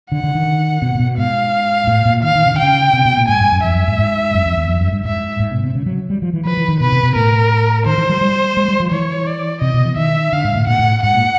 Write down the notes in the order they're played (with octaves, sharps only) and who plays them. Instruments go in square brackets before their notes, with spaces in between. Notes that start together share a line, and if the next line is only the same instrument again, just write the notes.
[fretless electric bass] D3 [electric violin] F#5
[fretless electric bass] D3
D#3
B2
A#2
B2
[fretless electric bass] G#2 [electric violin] F5
[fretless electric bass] A2
A#2
[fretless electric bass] D#3 [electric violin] F5
[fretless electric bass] D#3
C#3
D3
[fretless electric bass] C#3 [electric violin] G5
[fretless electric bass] C3
B2
A#2
[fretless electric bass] G#2 [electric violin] G#5
[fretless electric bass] G2
F#2
[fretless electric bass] F2 [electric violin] E5
[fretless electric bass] F#2
G#2
G#2
F#2
F2
E2
F2
F#2
G2
[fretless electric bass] G#2 [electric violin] E5
[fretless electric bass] G#2
B2
C3
C#3
F#3
G3
F3
E3
[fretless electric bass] F3 [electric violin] B4
[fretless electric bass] E3
D#3
[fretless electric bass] B2 [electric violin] B4
[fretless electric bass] C3
B2
[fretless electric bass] A2 [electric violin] A#4
[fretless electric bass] D#3 [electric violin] C5
[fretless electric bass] E3
F#3
G3
G#3
G3
F3
[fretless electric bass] E3 [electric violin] C#5
[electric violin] D5
[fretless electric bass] C3 [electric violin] D#5
[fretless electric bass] B2
E3
[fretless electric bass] D#3 [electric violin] E5
[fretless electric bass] D3 [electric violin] F5
[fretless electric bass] G#2
A2
[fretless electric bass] A#2 [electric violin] F#5
[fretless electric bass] A2
[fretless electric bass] G#2 [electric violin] F#5
[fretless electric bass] A#2